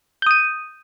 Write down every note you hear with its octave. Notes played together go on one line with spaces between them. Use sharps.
D#6 G6 D#7